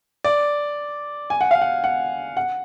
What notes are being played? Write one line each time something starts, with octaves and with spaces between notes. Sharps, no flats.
D5
G#5
F#5
F5
F#5
F#5
F#5